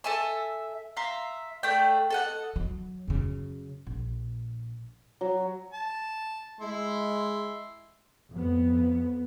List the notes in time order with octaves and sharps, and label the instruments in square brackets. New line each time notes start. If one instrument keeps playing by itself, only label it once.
[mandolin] A4 E5 G#5 A5
E5 F5 A#5 C6
A3 D4 G5
A4 D#5 F#5
[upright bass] F#3
F#2 C#3
A#1
[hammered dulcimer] F#3
[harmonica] A5
[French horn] G#3 [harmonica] E4 C6
[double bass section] F2 B3